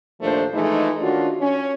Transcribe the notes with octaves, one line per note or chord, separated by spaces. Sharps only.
D#2 A#2 F3 A3 D4 C5
E3 F3 G#3 A3 D#4
D#3 C#4 D4 F4 F#4
C#4